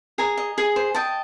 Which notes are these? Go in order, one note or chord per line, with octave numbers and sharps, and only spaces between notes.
G#4 G#5 A#5
D#5
G#4
C5
D#5 G5 A5